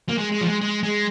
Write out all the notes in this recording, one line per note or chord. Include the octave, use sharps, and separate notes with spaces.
A#3
G#3
G#3
F3
G#3
G#3
G#3